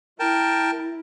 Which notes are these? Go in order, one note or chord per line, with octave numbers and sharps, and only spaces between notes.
E4 A#4 G5 A5